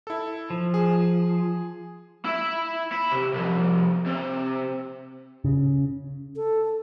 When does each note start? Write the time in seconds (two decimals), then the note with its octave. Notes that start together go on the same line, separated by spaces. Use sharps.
0.07 E4 A4
0.50 F3
0.74 G#4
2.25 E4 E5
2.92 E4
3.12 C3
3.33 C2 F2
4.06 C3
5.45 C#3
6.36 A4